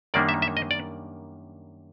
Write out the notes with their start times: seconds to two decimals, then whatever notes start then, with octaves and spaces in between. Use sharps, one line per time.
0.14 F#2 D#3 G3 A#3 D4 D5
0.29 E5
0.42 E5
0.57 D#5
0.71 D5